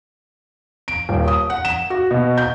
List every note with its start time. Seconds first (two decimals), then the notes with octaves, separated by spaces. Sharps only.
0.88 D7
1.09 D#1
1.28 D#6
1.50 F#5
1.65 E7
1.90 F#4
2.11 B2
2.38 G6